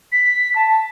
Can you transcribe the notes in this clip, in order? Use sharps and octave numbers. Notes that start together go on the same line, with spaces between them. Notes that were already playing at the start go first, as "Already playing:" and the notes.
B6
A5